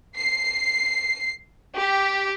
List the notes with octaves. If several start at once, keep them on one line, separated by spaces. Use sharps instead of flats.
C7
G4